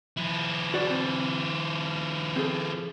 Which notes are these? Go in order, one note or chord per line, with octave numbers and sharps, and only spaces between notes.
F3 E4
F#4 D5
C4 A5
C4 G#4 A4